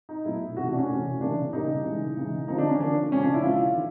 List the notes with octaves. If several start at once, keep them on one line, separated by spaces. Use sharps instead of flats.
D#4
B2 F#3 A3 E4
C3 E3 A3 F#4
D4 F#4
C#4
C3 E3 A3
C#3 E3 G3 A#3 D4
C#3 E3 G3 A#3 D#4
C#3 E3 G#3
C#3 E3 G#3
D3 F3 A#3 D#4
D4
C#4
D3 F3 A#3 D4
C#3 F3 G#3 C#4
D4
E4
C#3 F3 G#3 F4
D#3